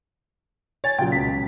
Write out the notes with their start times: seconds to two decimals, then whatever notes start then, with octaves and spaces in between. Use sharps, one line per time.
0.84 C#5 G#5 A6
0.99 A#2 C#3 F#3 G5
1.12 C#2 B2 B6